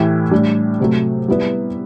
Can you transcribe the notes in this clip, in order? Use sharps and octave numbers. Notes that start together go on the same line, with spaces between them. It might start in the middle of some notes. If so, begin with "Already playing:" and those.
Already playing: A2 E3 A3 E4 G4
A2 G3 D4
C3 F#3 A3
G3 B3 E4 B4